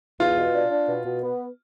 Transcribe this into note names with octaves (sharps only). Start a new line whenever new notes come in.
E2 F4
B2
D4
D4
B2
B2
B3